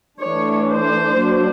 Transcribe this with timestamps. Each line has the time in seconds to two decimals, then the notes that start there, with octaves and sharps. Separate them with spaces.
0.21 E3 A3 D4 C#5
0.70 C5
1.20 F#3 A#3 D4